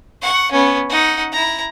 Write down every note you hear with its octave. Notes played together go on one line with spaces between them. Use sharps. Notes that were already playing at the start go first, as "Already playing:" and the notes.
F#5 C#6
B3 C#4
D#4 F#5
E4 A#5